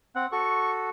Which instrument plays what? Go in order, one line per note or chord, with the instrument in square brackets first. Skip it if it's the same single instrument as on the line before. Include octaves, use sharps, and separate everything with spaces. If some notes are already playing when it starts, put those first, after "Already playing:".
[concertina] C4 [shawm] F#5
[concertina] F#4 A4 [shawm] C#6